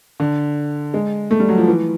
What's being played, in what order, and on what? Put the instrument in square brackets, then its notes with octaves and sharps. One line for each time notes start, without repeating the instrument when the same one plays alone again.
[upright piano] D3
G#3
A3
G3
F#3
F3
E3